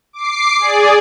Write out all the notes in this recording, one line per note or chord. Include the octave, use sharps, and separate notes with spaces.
D6 C7
G#4 D5